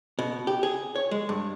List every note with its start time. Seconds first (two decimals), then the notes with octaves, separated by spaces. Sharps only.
0.19 B2
0.47 G4
0.63 G#4
0.96 C#5
1.11 G#3
1.29 G2